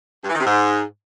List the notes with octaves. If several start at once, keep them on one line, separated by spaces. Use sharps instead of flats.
G2
E3
D#3
C3
G#2